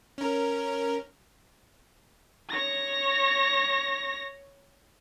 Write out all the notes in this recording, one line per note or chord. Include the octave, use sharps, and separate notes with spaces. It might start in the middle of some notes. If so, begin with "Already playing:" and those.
C#4 A#4
C#5 A#6